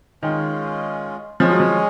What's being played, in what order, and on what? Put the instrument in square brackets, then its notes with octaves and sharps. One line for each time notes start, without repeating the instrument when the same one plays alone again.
[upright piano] D#3 [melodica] G#3 C#4 F4 G#4
[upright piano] F3 [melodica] G#3 C#4 G#4 C#5
[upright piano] F#3
F3